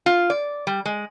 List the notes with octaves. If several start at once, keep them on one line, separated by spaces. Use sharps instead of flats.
F4
D5
G3
G#3